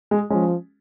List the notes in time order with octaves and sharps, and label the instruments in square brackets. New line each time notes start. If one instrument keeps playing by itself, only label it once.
[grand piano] G#3
[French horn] F3 [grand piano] G#3 C#4